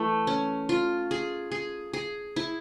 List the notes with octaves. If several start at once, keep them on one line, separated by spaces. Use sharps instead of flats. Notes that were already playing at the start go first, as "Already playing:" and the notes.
Already playing: E3 A3
C#4
F4
G#4
G#4
G#4
E4